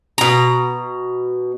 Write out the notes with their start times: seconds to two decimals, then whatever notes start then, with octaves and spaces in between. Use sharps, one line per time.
0.18 B2 A#5